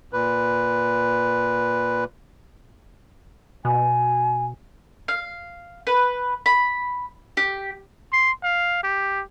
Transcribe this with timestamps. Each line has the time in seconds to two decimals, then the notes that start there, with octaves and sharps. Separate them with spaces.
0.13 A#2 B4
3.65 B2 G#5
5.08 F5
5.87 B4
6.46 B5
7.37 G4
8.13 C6
8.43 F5
8.84 G4